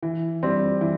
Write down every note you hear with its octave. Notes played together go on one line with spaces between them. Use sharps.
E3
G3 C4
E3